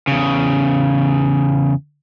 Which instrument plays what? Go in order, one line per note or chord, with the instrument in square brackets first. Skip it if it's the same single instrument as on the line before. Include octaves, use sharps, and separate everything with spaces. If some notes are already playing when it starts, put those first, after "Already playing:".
[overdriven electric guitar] E2 C#3